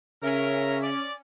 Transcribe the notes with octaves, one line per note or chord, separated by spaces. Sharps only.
C#3 C#4 A#4 E5
D5